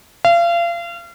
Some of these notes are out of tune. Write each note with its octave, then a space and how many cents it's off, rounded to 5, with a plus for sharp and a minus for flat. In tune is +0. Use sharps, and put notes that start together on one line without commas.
F5 -35